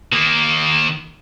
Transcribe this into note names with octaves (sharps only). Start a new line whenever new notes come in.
D#3 A#3